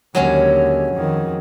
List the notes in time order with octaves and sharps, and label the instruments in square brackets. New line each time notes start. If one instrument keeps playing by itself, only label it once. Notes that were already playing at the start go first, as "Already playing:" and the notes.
[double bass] D#2 D3 [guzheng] F#3 G#3 C#4
[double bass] F2 D#3